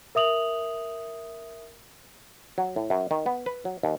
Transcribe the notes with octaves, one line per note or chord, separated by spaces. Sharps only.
A#4 E5 D#6 F7 F#7
F#3
A2
F#2
D#3
B3
B4
F#3
D#2